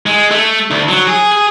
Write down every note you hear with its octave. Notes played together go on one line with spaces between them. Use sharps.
G#3
A3
D2
F#3
G#4
G#4